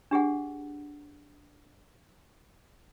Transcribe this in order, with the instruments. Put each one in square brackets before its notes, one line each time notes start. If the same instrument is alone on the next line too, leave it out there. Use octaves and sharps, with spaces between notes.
[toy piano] D4 G4 G#4 F#5